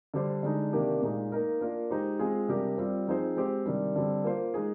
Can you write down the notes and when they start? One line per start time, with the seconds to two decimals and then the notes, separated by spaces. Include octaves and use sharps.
0.14 D3 G3 D4 G4 C5
0.43 D3 G#3 D#4
0.73 C3 D#3 A#3 D4 G4
1.02 A#2 G#3 D#4
1.32 A#3 D#4 A#4
1.61 A#3 D4 F4 A#4
1.91 G#3 D#4 G4 C5
2.19 G#3 C4 F4 G#4
2.48 C3 G3 D4 G4 A#4
2.78 G3 C4 F4
3.08 F3 C4 D#4 G#4 C5
3.37 G#3 C4 G4 C5
3.66 C3 D#3 G3 D4
3.96 D3 G3 C4
4.24 A#3 F4 C5
4.54 G#3 D#4 G#4